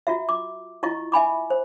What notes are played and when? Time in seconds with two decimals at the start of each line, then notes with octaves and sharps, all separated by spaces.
0.07 F4 F#4 E5
0.29 D6
0.83 E4 F4 D#5 C#6
1.12 E5 G#5 B5 D6
1.50 C5